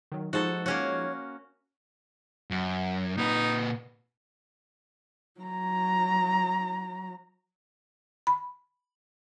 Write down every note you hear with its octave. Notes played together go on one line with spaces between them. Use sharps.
D#3 F#3
F3 G#3 D#4 F#4 A4 C5
A#3 C#4 F#4 C#5
F#2
A#2 D#4 B4
F#3 A#5
B5